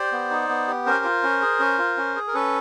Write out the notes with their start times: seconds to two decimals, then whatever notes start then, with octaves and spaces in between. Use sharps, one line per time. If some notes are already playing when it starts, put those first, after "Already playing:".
Already playing: G4 C5 D5
0.12 B3
0.31 D#4
0.49 B3
0.68 G4
0.86 C#4 A#4 C5
1.05 F4
1.23 C#4
1.41 G#4
1.60 C#4
1.78 F4
1.97 C#4
2.16 G#4
2.27 A#4
2.34 C#4 A4 B4